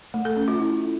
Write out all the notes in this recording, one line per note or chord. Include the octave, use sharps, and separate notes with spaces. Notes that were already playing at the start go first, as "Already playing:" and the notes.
A3
A4
C#4
F4
E4